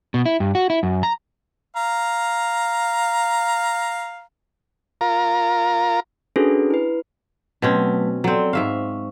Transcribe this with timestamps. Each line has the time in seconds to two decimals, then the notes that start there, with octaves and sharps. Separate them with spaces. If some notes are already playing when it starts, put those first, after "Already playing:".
0.14 B2
0.26 E4
0.40 G2
0.55 F#4
0.70 E4
0.83 F#2
1.03 A#5
1.76 F5 A#5
5.01 F4 A#4 A#5
6.36 C#4 D4 F#4 G#4 A4 B4
6.70 E4 B4
7.62 B2 F#3 A3 C4 C#4 B4
8.24 F#3 C4 A4 D5
8.53 G#2 E5 F5 C#6